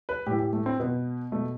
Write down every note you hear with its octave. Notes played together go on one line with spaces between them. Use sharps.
B4
A2 E3 G4
G4
A3
C4
B2 B3
B2 A3